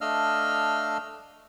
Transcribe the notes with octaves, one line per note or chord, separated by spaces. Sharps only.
A3 D4 D#5 F5 E6 F6